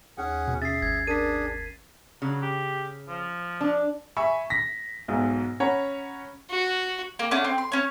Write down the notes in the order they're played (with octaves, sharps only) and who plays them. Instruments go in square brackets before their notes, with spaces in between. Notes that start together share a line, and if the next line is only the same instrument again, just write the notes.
[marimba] D#2 [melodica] C#4 G#4 F#5
[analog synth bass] B2
[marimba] C#4 [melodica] G#4 E5 [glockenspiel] A6 C7
[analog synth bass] G#1 [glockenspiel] G#6
[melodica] D4 G#4 [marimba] A#4 [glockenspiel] B6 D#7
[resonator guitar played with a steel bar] C#3 [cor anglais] F#3
[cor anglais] G4
F3
[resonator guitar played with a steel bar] D4
[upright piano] E5 G#5 B5 C#6
A#6 B6
B1 G#2 B2
C#4 C#5 F#5 A#5 B5
[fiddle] F#4
[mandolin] A#3
A3 C#4 D4 F#5
C4
C6
C#4 C#5